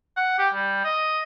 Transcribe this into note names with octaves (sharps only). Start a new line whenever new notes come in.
F#5
G4
G3
D#5